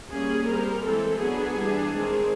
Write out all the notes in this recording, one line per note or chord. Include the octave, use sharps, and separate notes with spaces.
G3 A#3 C#4 G#4
G3 C4 A#4
E3 G#3 C4 A4
F#3 B3 D4 G#4
E3 G3 B3 D4
D#3 G#3 C4